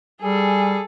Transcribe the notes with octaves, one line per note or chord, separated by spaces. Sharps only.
G3 G#4 A4 G#5